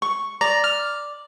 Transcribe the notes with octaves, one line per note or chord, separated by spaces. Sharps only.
C#6
D5 A#5
F6